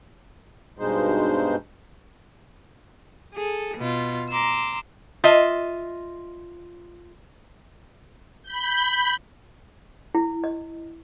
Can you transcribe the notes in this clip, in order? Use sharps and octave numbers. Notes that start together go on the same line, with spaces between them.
G2 B2 G#3 D#4 C5
G#4 A4
B2 F4
A#5 C6 D6 E6
F4 D#5 E5
B5 G6
E4
D#5